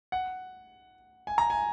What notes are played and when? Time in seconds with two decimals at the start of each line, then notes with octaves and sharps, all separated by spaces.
0.12 F#5
1.27 G#5
1.38 A#5
1.50 G#5